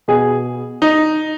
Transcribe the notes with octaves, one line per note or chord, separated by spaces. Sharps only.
B2 G#4
D#4